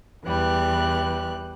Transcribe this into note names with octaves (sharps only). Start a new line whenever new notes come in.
E2 E3 G3 F#6